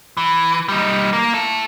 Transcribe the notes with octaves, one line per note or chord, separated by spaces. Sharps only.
E3
G3 D#4
A#3
E4 A4